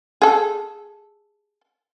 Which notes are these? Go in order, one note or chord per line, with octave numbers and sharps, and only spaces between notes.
G#4 A4